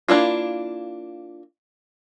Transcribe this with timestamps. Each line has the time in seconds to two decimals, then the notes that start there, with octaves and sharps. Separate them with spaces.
0.08 A#3 D4 E4 F4